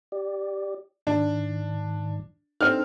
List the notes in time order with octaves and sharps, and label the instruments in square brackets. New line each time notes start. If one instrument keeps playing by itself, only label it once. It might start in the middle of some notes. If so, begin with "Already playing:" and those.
[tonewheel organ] G4 D5
[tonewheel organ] G#2 D#3 [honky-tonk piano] D4
[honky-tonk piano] C4 F6 [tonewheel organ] D4 D#4 A4